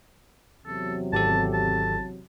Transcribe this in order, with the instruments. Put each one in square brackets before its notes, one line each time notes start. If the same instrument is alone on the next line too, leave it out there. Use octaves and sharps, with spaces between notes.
[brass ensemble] E2 C3 F#3 [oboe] A4
[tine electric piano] G#1 G4 A4 [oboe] A5
[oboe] A5